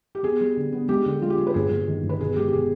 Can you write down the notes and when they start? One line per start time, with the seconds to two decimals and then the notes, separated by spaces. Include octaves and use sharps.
0.15 G4
0.23 B3 G#4
0.41 G3
0.57 D3
0.72 B3
0.88 G#3 G4
1.06 D3
1.22 G#3 F4
1.30 G4
1.38 G#3 G#4
1.47 B4
1.54 G1 G#4
1.71 G1
1.88 D#3
2.03 G1
2.09 B4
2.20 B2 G#4
2.36 G#3 G4
2.48 G4
2.53 B2 G#4